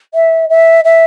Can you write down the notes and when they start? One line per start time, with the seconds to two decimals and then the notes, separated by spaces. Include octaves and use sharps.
0.14 E5
0.49 E5
0.84 E5